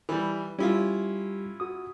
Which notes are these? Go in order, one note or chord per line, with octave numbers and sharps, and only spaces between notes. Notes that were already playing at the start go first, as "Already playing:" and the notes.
E3 G3
G3 C#4 E4 F4 G4
F#4 D#6